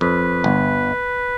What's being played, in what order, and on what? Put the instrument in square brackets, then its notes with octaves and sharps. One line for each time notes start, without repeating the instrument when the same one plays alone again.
[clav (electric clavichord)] F2 [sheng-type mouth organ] B4
[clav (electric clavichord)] G1